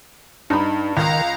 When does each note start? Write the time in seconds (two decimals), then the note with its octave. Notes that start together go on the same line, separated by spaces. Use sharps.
0.50 G2 D#4 B5
0.97 C#2 D#3 F5 A#5